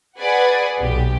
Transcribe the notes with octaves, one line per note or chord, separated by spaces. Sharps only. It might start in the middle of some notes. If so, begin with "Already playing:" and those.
G#4 B4 D5 F#5 G#5
B1 G4